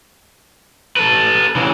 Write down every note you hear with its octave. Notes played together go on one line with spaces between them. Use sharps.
A4 B4
C#3 E3